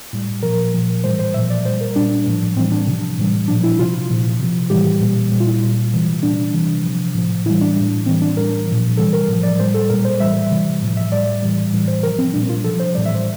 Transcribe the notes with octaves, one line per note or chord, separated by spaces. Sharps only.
A2 G3
A#2 F3 A#4
A#2 F3
A2 E3 G3 C5
C5
A#2 F3 E5
D5
A#2 G3 C5
A#4
A#2 G3 D4
A2 F3
A2 E3 G3 C4
D4
C3 F3
A2 E3 G3
A#2 F3 D4
E4
C3 F3 F4
A#2 F3
C3 F3
A2 E3 G3 G4
A#2 G3
A#2 G3
F4
E4
A#2 G3
C3 E3 G3
A#2 G3 D4
C3 E3 G3
C3 F3
A2 F3
A2 E3 G3 E4
D4
A2 G3
A2 E3 G3 C4
D4
A2 G3 A#4
A#2 F3
C3 E3 G3 A4
A#4
A2 F3
D5
A2 G3 C5
A4
A#2 G3 A#4
C5
A2 E3 G3 E5
C3 E3 G3
A2 F3
E5
A2 G3 D5
A2 E3 G3
A2 E3 G3
C5
C3 F3 A#4
C4
A#2 G3 D4
F4
C3 F3 A4
C5
A2 E3 G3 D5
E5
C5